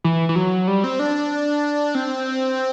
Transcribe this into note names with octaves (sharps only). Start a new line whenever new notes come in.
E3
E3
F#3
G3
C4
D4
C4